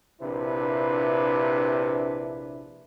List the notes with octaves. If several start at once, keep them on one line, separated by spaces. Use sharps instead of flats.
A#1 C3 D4 E4 B4